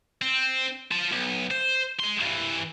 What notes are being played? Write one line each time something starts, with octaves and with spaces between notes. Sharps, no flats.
C4
F4 A5
B1
C5
G#3 C6
G2 E3